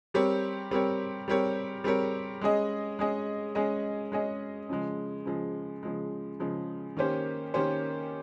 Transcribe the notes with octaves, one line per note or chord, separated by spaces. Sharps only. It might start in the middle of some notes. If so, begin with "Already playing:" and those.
G3 C4 G4 A#4 C#5
G3 C4 G4 A#4 C#5
G3 C4 G4 A#4 C#5
G3 C4 G4 A#4 C#5
G#3 C#4 G#4 D#5
G#3 C#4 G#4 D#5
G#3 C#4 G#4 D#5
G#3 C#4 G#4 D#5
C#3 F3 G#3
C#3 F3 G#3
C#3 F3 G#3
C#3 F3 G#3
D#3 A#3 C#4 G4 C5
D#3 A#3 C#4 G4 C5